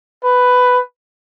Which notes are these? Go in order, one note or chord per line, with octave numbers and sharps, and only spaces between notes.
B4